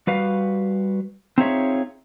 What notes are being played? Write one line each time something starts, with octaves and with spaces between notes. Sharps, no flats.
G3 F#4 B4 F5
C4 D#4 F4 G#4 C#5 E5